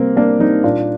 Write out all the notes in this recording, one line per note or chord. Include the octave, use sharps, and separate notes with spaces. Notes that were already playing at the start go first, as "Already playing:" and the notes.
Already playing: C3 G3 A#3 C4
G3 A#3 D4
G3 C4 D#4
A#2 D4 F4